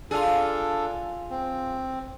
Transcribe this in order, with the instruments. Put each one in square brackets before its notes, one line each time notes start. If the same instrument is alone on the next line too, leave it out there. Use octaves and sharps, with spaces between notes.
[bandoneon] D4 A4 [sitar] F4 G#4
[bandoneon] C4